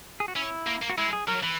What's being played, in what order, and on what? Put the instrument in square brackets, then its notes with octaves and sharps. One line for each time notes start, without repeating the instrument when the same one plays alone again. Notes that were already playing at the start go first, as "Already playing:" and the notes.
[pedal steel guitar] G#4
F#4
[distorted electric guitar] C#4 [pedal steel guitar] E4
[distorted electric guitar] A#3
A#3
[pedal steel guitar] F#4
[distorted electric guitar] G#3 [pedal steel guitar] E4
[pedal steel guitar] G#4
[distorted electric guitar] F#3 [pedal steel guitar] A#4
[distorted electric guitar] E3 [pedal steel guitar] B4